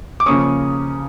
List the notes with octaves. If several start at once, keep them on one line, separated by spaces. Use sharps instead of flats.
D6
C#3 F3 A#3 C#4 C#6 D#6